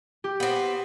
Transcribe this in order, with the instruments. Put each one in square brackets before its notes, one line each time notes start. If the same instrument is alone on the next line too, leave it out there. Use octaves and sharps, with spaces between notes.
[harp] G4
[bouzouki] B3 C4